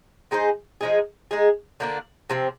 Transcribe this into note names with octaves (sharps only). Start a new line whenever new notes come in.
G#3 D#4 G#4 C5
F3 G#3 D#4 G#4
G#3 D#4 G#4
D3 F3 A#3 D4
C3 F3 C4